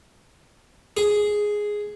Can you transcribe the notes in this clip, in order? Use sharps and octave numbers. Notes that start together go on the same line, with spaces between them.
G#4